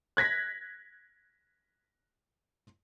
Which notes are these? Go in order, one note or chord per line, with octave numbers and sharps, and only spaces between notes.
F#6 G#6 A#6 B6